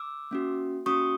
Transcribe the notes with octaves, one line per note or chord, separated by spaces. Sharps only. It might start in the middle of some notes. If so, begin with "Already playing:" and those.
Already playing: D6 E6
A#3 C#4 F#4
A#3 C#4 F#4 C#6 D#6